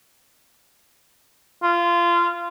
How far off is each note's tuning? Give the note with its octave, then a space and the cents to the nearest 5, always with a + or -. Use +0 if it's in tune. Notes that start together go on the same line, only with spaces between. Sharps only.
F4 -20